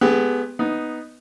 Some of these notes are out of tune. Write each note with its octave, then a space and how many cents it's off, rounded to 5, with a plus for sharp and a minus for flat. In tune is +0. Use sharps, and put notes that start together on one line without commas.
G#3 +35 B3 +5 G4 +40
B3 +0 D#4 +0